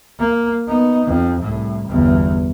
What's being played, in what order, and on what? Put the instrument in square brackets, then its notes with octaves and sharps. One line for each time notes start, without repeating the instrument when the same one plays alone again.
[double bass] A#3
B3 D#4
F2
C2 A2
G1 E2